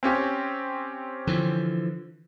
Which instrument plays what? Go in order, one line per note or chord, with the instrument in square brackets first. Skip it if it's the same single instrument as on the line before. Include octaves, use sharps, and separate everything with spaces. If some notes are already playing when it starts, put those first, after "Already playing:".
[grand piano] C4 C#4 G4
[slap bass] D3 E3 F3